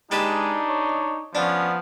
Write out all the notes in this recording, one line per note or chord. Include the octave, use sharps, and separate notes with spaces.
G#3 D4 D#4 G4 B4 A5
C#5
F3 B3 C#4 D4